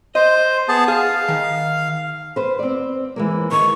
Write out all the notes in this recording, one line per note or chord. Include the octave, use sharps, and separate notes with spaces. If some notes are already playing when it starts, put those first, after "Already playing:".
C5 D#5
B3 G#4 A5
G#4 F5
D#3
B4 C5
C4 D5
E3 G#3 A#3
D#3 C#6